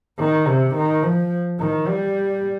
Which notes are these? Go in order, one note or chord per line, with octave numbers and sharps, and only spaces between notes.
D#3
C3
D#3
F3
D#3
G3